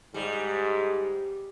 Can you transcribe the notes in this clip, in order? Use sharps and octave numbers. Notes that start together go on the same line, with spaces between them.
G#2 G3